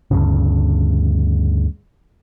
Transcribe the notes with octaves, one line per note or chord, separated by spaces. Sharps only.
D2 G2 C#3